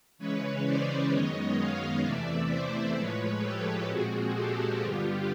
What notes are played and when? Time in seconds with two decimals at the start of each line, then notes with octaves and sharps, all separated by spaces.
0.18 C#3 E3 G#3 C#4 B4 C#5
0.65 C5 D5
1.11 F#2 D#3 G#3 B3 C#5 D#5
1.57 D#5 F5
2.03 E2 C3 E3 A3 D5 E5
2.49 C5 D5
2.96 A2 F3 G#3 B4 C#5
3.42 G4 A4
3.88 A#2 F3 G#3 C4 F#4 G#4
4.35 G4 A4
4.81 G2 D3 G3 B3 F4 G4